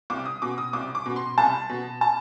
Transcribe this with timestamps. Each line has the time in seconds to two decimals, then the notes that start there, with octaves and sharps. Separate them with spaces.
0.10 C2 D6
0.25 D#6
0.42 B2 D6
0.58 D#6
0.73 C2 D6
0.95 D6
1.06 B2
1.16 C6
1.38 C2 A5
1.69 B2
2.01 A5